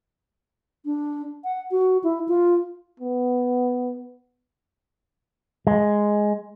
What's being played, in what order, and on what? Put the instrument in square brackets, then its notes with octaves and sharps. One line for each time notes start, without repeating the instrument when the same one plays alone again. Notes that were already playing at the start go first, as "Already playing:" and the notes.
[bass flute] D4
F#5
F#4
E4
F4
[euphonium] B3
[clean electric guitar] G#3